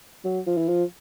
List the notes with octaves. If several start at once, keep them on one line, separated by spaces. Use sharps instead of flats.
F#3
F3
E3
F3